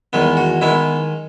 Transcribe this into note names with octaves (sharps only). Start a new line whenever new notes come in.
E2 D#3 G#3 B3
F#4
D#3 G#3 B3 E4